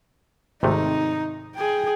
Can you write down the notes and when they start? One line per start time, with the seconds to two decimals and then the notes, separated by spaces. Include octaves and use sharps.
0.63 G#1 C3 A3 D#4
1.56 G#4 G5